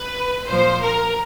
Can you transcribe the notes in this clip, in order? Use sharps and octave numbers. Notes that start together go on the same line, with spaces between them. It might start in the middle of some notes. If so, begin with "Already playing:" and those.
Already playing: B4
A#2 F3 C5
A#4